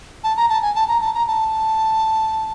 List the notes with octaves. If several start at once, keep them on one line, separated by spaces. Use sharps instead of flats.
A5
A#5
A5
G#5
A5
A#5
A5
A#5
A5